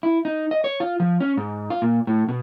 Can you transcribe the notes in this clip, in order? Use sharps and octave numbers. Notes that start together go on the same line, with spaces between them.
E4
D#4
D#5
C#5
F4
F3
C#4
G#2
F4
A#2
A2
B2